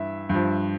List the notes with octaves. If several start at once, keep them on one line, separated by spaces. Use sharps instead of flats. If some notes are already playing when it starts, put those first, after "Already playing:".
Already playing: G2 E3 E5
G2 F3